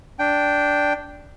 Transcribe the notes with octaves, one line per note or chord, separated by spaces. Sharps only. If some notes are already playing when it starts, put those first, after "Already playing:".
D4 G5